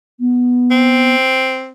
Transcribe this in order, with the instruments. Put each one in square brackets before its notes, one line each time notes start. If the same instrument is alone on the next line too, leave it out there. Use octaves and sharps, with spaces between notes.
[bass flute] B3
[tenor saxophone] C4